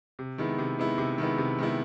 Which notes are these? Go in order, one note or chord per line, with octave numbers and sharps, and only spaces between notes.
C3
D#3 G#3 B3 E4
C3
D#3 G#3 B3 E4
C3
D#3 G#3 B3 E4
C3
D#3 G#3 B3 E4